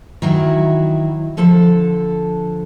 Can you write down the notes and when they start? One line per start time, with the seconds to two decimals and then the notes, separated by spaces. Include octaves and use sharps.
0.22 D#3 E3 F#3 E4 F#4
1.37 D3 F3 A4 A5